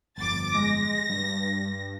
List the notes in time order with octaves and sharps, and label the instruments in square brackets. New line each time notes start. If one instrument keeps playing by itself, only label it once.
[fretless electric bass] G1 F2 [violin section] D6 A6
[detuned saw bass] G#3 [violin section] A#6
[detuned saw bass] G2 [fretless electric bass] G3